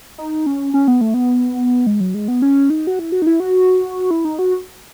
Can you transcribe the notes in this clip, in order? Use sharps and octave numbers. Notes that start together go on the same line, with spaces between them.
D#4
C#4
C#4
B3
A3
B3
G#3
F#3
G#3
B3
C#4
D#4
F#4
E4
F#4
D#4
E4
F#4
E4
D#4
F#4